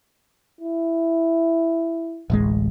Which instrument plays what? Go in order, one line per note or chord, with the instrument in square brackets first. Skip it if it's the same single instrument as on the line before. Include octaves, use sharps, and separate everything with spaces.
[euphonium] E4
[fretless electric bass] D1 A1 G#3